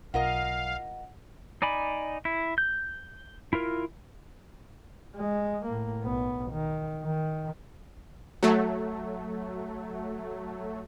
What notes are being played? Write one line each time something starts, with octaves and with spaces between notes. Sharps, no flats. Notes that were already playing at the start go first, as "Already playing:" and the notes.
B1 F4 A#4 D#5 F5 F#5
D#4 D5 G#5 B5
E4
G6
E4 F4 A#4
G#3
A2 A#3
B1 B3
D#3
D#3
F#3 A3